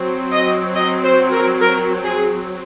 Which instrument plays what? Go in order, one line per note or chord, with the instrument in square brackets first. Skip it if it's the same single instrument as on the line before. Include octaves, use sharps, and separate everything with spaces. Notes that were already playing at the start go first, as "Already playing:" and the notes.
Already playing: [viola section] F#3 C4
D#5
D#5
C5
A#4
A#4
G#4